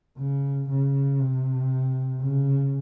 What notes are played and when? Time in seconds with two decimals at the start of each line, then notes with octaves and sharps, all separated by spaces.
0.18 C#3
0.70 C#3
1.20 C3
2.20 C#3